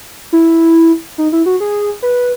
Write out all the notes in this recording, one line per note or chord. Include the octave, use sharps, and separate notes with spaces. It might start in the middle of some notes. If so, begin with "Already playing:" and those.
E4
D#4
E4
F#4
G#4
B4